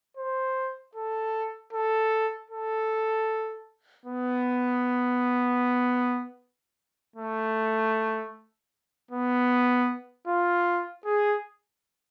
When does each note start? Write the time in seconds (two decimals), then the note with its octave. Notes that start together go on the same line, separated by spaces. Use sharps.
0.17 C5
0.95 A4
1.73 A4
2.50 A4
4.05 B3
7.16 A3
9.11 B3
10.27 F4
11.05 G#4